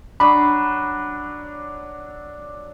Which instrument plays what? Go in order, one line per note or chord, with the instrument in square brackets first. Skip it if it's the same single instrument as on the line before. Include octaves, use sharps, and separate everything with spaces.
[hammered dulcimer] F#3 D4 [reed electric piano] B5